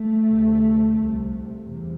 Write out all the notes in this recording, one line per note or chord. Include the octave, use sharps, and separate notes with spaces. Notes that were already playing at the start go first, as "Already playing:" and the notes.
Already playing: A3
D2 C3
C2 C3
E2 C3